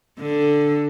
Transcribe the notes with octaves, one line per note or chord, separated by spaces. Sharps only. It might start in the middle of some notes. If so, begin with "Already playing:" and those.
D3